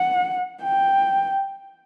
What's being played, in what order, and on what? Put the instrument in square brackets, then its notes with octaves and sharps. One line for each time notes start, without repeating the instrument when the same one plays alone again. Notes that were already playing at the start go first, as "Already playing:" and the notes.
Already playing: [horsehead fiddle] F#5
G5